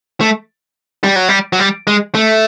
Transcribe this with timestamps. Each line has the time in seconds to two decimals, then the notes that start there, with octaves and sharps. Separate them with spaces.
0.21 A3
1.04 G3
1.16 F#3
1.29 G3
1.53 F#3
1.59 G3
1.87 G#3
2.15 A3